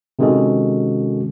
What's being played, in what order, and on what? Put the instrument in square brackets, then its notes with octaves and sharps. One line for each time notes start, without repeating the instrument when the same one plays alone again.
[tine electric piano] C3 D#3 G#3 C#4 F#4 A4